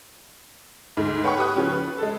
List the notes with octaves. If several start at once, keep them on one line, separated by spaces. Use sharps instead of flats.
D2 G#2
B4 C#5 F#5 G5 B5 C#6
G4 B4 D#6 F#6
C#3 F3 C#4
B4
G#3 A4